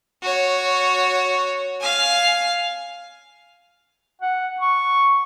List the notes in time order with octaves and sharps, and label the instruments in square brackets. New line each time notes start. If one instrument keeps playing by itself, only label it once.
[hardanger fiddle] F#4 C#5
F5 G#5
[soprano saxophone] F#5
C#6